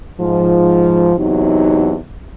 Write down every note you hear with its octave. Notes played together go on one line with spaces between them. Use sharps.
G#2 F3
E2 C3 F#3 D#4